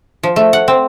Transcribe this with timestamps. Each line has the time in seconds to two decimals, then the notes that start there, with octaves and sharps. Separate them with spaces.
0.23 F3
0.36 A3
0.53 F#5
0.68 C4